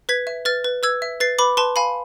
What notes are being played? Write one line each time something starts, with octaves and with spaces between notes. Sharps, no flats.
B4 G#6 B6
E5
B4 F6 A6
B4
B4 E6 G#6
E5
B4 A6 C7
B4 B5 D6
B4 A5 C6
F5 G#5 B5